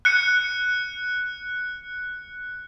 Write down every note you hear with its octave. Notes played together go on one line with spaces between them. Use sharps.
F#6 C#7